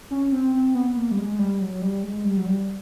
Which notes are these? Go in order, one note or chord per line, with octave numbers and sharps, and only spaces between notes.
C#4
C4
C4
B3
A#3
G3
G#3
G#3
G3
F#3
G3
G#3
G3
F#3
G3